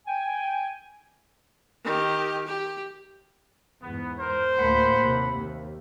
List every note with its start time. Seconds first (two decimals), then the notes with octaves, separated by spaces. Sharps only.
0.07 G5 G#5
1.84 D#3 G4
2.46 G4
3.82 E2 G#2 B3
4.20 A#4 C5
4.58 D2 A2 A#3 A4 F#5 B5
5.01 D#2 C3
5.38 D#2